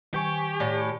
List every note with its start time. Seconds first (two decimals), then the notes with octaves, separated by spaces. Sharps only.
0.14 D#3 G4 G#5 C#6 G6
0.60 A2 D5